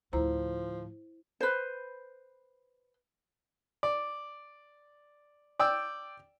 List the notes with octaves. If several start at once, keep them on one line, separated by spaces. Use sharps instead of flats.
D2 A2 F3 E4 C5 A#5
B4 C5
D5
D5 G5 E6